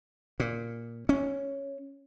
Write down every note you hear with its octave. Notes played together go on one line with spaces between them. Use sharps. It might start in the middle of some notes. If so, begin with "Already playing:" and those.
A#2
C#4